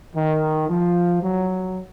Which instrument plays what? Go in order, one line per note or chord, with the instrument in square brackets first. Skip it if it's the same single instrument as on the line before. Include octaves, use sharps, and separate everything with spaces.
[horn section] D#3
F3
F#3